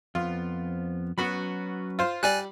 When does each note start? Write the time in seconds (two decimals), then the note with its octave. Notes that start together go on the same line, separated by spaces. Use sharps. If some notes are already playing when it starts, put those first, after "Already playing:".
0.15 F2 F3 B3 F4
1.18 F#3 B3 C#4 F#4 B4 B5
1.99 F4 C5
2.23 G3 D5 G#5 F#6